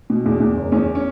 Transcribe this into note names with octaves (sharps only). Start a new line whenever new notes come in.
B2
E2
E2
F#1
E2 C#4
C#4